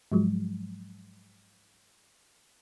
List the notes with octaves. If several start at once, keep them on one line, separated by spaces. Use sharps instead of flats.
G#2 F3 F#3 G#3